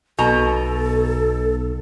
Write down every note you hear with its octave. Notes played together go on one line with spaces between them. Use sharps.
B1 B2 A4 A#5